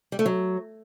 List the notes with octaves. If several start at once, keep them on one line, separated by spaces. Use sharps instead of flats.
G3
A3
F#3